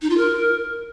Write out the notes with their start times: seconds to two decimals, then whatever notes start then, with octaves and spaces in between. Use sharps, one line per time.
0.02 D#4
0.10 F4
0.18 A#4